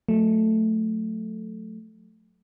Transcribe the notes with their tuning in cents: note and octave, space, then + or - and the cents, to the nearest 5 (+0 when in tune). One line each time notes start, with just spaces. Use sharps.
F#3 -30 A3 +0